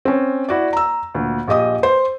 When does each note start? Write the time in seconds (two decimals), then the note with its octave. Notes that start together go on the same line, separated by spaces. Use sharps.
0.05 C4 C#4
0.49 E4 F#4 D5
0.73 A#5 E6
1.15 D2 A#2
1.48 A#1 G4 D#5 D#6
1.83 C5